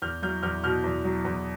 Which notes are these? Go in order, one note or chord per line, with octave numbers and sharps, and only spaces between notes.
E2 F6 G6
F#3 F6 G6
E2 F6 G6
B2 F6 G6
E2
F#3
E2